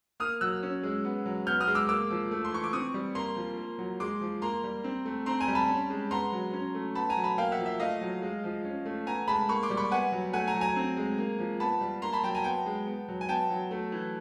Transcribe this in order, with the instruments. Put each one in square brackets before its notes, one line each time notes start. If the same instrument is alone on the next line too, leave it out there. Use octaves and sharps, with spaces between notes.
[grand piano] A#3 D#6 F6
F#3 E6 F#6
C#4
G#3
B3
F#3
B3 F6 G6
D#6 F6
G#3
D6 E6
A#3 D6 E6
F3
A3
C6
E3 C#6
D6
C4 C#6 D#6
G3
A#3 A#5 C6
F3
A#3
F#3
G#3 C6 D6
F3
A#3 A#5 C6
G3
C4
A3
C4 A#5 C6
G#5 A#5
G3
A5 B5
C#4
G#3
B3 A#5 C6
F#3
C#4
A3
B3 A5 B5
G#5 A#5
F#3
A5 B5
A#3 F5 G5
E5 F#5
F3
E5
A3 D#5 F5
F#3
G#3
F3
C#4
A3
B3 G#5 A#5
G#3 A5 B5
A#3 B5 C#6
C6 D6
G3
B5 C#6
B3 F#5 G#5
F#3
A3 F#5 G#5
G#5 A#5
F#3
G#5 A#5
C4
G#3
A#3
F3
B3 A5 B5
G3
A#3 A#5 C6
A5 B5
F#3 G5 A5
G#5 A#5
B3 G5 A5
G#3
B3
F#3
G#5
B3 G5 A5
F#3
A3
E3